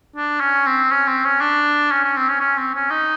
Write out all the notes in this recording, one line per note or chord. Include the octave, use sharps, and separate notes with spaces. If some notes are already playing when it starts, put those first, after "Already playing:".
D4
C#4
C4
C#4
C4
C#4
D4
C#4
C#4
C4
C#4
C#4
C4
C#4
D#4